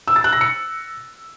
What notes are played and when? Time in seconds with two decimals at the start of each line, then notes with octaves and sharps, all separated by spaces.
0.08 E6
0.16 A6
0.24 F#6
0.33 A#6
0.41 C#7